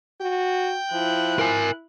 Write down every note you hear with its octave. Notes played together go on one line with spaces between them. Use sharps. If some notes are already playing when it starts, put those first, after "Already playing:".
F#4 G5
F3 E4 F#6
A#4 G#5